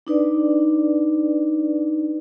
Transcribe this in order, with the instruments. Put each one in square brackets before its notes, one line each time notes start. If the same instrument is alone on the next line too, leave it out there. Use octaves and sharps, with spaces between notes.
[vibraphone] D4 D#4 B4 D5